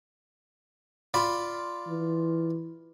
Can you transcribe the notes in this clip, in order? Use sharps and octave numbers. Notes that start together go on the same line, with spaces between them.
F4 D5 B5
E3